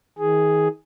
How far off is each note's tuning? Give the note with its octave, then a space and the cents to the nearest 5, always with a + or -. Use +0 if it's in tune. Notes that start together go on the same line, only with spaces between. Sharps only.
D#3 +35 G#4 +0